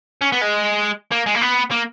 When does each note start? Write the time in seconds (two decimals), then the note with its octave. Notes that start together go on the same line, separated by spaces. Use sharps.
0.22 C#4
0.32 B3
0.42 G#3
1.12 A#3
1.26 G#3
1.35 A#3
1.41 B3
1.71 A#3